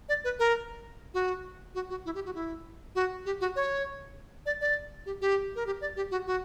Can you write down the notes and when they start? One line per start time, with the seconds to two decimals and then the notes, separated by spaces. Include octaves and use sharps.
0.09 D5
0.24 B4
0.39 A#4
1.14 F#4
1.75 F#4
1.90 F#4
2.05 E4
2.15 G4
2.26 F#4
2.35 E4
2.95 F#4
3.26 G4
3.41 F#4
3.56 C#5
4.46 D5
4.61 D5
5.06 G4
5.21 G4
5.56 A#4
5.67 G4
5.81 D5
5.96 G4
6.11 F#4
6.27 F#4